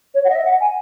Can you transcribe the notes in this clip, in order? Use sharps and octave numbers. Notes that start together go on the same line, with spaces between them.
C#5
F#5
D#5
E5
F#5
G#5